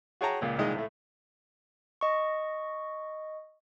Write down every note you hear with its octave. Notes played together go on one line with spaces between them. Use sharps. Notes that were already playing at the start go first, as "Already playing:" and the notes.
F#4 G#4 C#5 G5 A5 A#5
C#2 A#2 A#3
C2 A#2 D#3 G#3 D#5 D#6
A2 A3
D#5 C#6